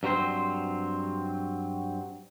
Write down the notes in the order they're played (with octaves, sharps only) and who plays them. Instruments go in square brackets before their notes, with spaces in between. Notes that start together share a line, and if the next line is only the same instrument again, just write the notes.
[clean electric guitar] G2 F#3 C4 C5